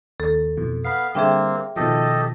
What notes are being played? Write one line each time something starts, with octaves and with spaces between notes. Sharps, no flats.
D#2 A4
F2 B2 E3
B3 F5 B5 C7
D3 G3 A#3 C4 G#4 E5 G5
B2 D#3 F3 G4 A4 D#5